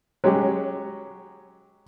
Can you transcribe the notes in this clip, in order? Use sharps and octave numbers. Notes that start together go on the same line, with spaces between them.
F#3 G#3 C#4 G4